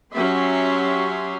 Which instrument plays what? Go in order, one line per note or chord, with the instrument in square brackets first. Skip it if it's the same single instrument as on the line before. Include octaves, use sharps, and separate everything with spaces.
[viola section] F#3 C#4 G4 E5 C6